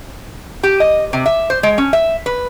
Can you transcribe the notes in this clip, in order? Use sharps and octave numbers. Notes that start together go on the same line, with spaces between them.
G4
D#5
C3
E5
C5
G#3
C#4
E5
B4